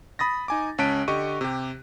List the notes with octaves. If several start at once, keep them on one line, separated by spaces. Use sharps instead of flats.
B5 D#6 A6 A#6
D#4 G#5 D6
C#2 C#4 A5 F#6 B6 D7
D3 G4 D#5 C#6 D#7
C3 G4